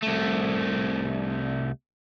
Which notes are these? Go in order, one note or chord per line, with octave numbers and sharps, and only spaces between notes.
C2 A3